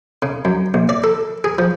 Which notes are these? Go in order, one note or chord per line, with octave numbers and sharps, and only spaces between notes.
C#3
F#2
A#1
D5
A4
G#4
F3